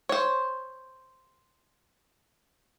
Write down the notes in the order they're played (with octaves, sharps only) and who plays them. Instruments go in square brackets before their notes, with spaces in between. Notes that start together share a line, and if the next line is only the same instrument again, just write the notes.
[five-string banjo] C5 C#5